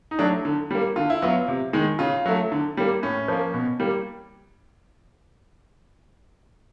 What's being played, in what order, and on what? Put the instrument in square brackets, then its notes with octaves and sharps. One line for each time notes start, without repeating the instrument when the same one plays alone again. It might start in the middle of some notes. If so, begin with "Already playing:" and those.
[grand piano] D#4
F#3 A3 D4
D3
G3 A#3
D3 F4
E4
F#3 B3 F4
C3
D#3 G#3
C#3 F4
F#3 A3
D3
G3 A#3
A2 C#4
F3 A#3
B2
G3 A#3